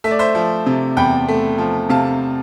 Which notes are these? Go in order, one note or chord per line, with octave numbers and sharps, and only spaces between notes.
A3 E5
D5
C5 E5
F3
C3
E2 G5 B5
A3
F3
C3 F5 A5